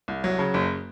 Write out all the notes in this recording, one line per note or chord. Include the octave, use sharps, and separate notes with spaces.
C2
F#3
C#3
F#1